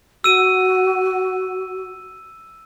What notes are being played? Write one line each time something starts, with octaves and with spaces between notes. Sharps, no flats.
F#4 E6 D#7